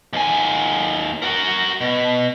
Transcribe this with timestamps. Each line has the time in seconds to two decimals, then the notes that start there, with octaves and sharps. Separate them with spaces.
0.13 D#2 G#5
1.22 F#4 A#4
1.80 B2